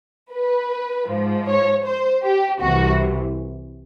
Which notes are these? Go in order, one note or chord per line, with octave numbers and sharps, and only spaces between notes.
B4
G#2 F3
C#5
C5
G4
C2 C3 E3 F#4